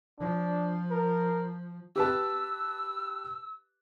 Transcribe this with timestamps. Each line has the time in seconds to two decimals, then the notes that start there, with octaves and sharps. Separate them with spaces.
0.20 F3 D4
0.91 A#4
1.96 G4 B4 A5 E6